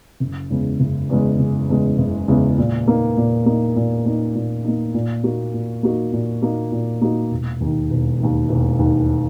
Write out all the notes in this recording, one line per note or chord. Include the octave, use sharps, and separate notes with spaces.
F#1
E2 C#3 G#3
F#1
E2 C#3 G#3
F#1
E2 C#3 G#3
F#1
E2 C#3 G#3
A#2
A#3 D#4
A#2
A#3 D#4
A#2
A#3 D#4
A#2
A#3 D#4
A#2
A#3 D#4 F#4
A#2
A#3 D#4 F#4
A#2
A#3 D#4 F#4
A#2
A#3 D#4 F#4
E1
D#2 D#3
E1
D#2 D#3
E1
D#2 D#3